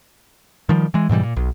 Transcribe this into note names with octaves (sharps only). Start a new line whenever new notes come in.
D#3 F3 G3
E3 G#3
G#2 B2 E3 G3
A#2
B1